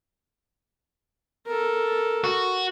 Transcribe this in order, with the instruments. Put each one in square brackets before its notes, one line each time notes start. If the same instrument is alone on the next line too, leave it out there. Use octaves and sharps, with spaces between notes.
[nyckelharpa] A4 A#4
[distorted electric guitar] F#4